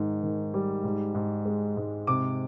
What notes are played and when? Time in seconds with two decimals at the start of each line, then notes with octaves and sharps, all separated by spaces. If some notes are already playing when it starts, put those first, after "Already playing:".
Already playing: G#2 D#3
0.23 D#3
0.54 G3
0.84 G#2
1.15 G#2
1.45 G#3
1.77 G#2
2.07 C3 D6